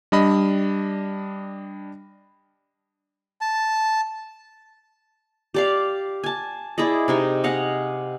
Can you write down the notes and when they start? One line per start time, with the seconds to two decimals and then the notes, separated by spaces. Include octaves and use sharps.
0.12 G3 D4 D#5 B5
3.41 A5
5.54 G4 D5 F5
6.23 G#5 A5
6.78 E4 G#4 D5 D#5
7.08 C3 D#4 G#5
7.44 D#5 F5 F#5 G#5